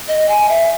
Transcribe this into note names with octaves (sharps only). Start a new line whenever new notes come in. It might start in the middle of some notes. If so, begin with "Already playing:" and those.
D#5
G#5
E5